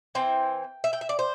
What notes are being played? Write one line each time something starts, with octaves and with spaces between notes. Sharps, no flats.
E3 C4 E4 G5
E5
G5
E5
D5
C5